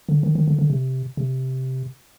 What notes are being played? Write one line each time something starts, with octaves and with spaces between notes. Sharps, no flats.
D3
D#3
D#3
D3
D3
C3
C3